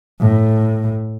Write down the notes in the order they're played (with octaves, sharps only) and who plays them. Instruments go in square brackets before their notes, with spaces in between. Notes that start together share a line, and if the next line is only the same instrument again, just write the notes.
[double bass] A2